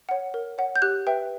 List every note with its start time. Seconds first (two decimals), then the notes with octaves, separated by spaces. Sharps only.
0.09 C#5 F#5
0.34 A#4
0.58 C#5 F#5
0.76 G6
0.82 G4 F#6
1.07 B4 E5 G5